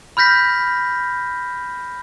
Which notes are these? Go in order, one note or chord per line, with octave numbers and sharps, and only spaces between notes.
B5 F6 G6 A#6 B6